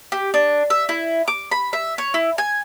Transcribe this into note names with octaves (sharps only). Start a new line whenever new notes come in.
G4
D4
E5
E4
D6
B5
E5
C#5
E4
G#5